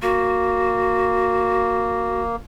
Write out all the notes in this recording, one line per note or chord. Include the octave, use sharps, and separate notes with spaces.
A#3 F#4